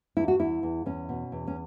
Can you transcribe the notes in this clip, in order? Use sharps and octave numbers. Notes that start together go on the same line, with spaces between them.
E2 E4
F#4
E2 E4
E2
E2 C#4
B2
E2
C#4